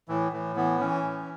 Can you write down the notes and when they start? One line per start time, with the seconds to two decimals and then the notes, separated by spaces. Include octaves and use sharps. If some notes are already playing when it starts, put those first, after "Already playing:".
0.08 A2 E3
0.32 A2 E3
0.56 E3 B3
0.80 E3 C#4
1.03 A2